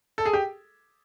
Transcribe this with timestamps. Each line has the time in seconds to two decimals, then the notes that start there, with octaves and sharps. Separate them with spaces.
0.18 A4
0.26 G#4
0.33 G4